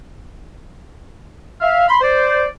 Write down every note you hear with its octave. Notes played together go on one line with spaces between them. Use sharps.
E5 F5
B5 C6
C5 D5